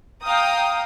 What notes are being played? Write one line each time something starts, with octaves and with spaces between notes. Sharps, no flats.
F5 G5 A#5 D#6